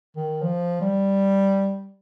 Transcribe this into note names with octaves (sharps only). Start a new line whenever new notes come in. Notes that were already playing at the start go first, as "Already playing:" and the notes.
D#3
F3
G3